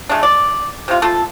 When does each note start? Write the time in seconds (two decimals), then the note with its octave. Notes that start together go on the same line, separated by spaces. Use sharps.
0.09 G#3 A3 D4
0.23 D5
0.88 C3 F4
1.02 A3 F4 A4